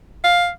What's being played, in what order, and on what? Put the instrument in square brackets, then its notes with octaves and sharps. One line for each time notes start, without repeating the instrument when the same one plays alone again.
[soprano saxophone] F5